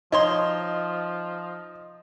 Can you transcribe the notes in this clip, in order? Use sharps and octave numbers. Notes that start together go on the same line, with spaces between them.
B2 F3 D#4 C#5 C6